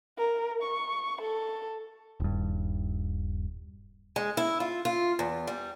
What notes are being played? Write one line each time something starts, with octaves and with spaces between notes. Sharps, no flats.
A#4
C#6
A4
D#1 G2
G#3
E4
F4
F4
E2
G3